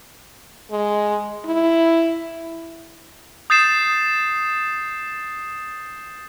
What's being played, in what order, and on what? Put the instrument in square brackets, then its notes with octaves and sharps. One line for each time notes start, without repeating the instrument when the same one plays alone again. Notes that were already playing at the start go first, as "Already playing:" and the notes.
[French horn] G#3
E4
[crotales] D#6 G6 A6 C7 E7